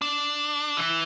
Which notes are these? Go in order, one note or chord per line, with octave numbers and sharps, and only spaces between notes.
D4
E3